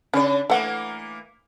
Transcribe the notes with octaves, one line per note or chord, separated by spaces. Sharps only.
C#3 C#4 D4 D5
E3 A3 A#3 F#5